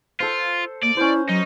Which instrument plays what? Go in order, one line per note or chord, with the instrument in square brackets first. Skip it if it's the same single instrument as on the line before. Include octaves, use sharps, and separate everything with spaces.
[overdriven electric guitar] F4 [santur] A4 C5
[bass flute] A#3 [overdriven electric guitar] D5
[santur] C#4 C5 [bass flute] E4
[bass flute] F#3 [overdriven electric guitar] D#4